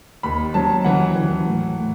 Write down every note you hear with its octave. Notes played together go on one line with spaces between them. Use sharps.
D#2 B5
F#3 A5
E3 F#5
E3
A2
A2